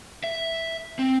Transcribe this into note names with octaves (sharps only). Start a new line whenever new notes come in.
E5
C4